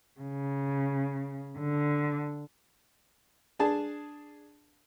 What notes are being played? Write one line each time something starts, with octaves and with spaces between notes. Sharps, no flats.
C#3
D3
D4 G#4 A5